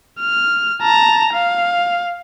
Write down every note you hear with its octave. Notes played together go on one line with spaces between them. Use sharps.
F6
A5 A#5
F5